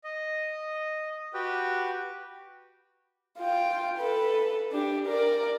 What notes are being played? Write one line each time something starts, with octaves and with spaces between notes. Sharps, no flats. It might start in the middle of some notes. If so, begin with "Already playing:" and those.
D#5
F#4 G4 B4 G5
F4 G5
A4 B4
D4 G4
A#4 D5